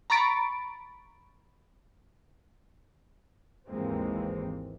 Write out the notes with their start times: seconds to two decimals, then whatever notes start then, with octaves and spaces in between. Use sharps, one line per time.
0.10 A#5 B5 C#6 A6 D7
3.68 G#1 D#2 E3 G#3 A#3 C4